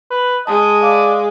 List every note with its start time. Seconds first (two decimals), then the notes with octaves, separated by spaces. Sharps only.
0.11 B4
0.47 G#3 D#5 A5
0.83 D5 F5